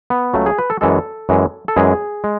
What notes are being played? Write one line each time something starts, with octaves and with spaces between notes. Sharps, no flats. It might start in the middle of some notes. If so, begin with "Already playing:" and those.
B3
C#2 C#3 F#3 A3
G#4
B4
A4
F#2 E3 G#3 A4
F#2 E3 G#3
A4
F#2 E3 G#3 G#4
G#3